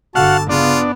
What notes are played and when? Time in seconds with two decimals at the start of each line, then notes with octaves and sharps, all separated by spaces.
0.15 G1 D3 F#4 F5 F#5 A5
0.49 C#3 B3 D4 F4